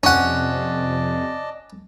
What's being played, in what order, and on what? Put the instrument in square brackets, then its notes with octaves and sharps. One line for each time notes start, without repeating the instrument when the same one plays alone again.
[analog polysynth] F2 C3 [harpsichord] C#4 F#5 [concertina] D5 D#5 A5